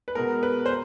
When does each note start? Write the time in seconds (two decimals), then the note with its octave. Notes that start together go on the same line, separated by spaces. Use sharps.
0.08 B4
0.15 B2 G#3 B3 A#4
0.43 B4
0.66 C5